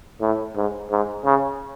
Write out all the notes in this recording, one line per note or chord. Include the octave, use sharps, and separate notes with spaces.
A2
G#2
G#2
C#3